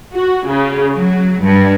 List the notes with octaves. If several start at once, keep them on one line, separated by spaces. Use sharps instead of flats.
F#4
C#3
F#3
G2